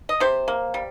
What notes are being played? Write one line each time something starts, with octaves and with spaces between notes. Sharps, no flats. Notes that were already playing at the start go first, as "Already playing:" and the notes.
D#5
C3 G4 C5
A#3
G3